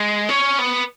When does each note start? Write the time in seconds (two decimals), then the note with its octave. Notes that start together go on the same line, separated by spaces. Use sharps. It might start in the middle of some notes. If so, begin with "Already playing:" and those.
Already playing: G#3
0.29 C#4
0.59 B3